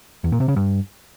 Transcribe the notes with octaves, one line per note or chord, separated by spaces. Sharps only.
E2
A#2
C3
C#3
G2